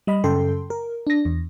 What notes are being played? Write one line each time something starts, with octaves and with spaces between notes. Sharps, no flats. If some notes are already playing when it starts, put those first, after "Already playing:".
G3 D#5 B5
F#2 C#3 A4 G5 C6
A#4
D4 A#6
E2